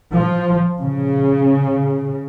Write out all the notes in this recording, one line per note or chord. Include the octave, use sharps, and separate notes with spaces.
F3
C#3